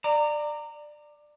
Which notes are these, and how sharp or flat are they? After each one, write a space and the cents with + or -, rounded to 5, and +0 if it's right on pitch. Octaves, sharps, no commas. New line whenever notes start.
D5 +15 A#5 -20